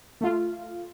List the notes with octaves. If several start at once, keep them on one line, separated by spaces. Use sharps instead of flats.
A3 F4